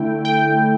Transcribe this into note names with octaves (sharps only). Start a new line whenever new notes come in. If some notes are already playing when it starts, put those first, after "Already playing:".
Already playing: D3 A3 E4 G5
G5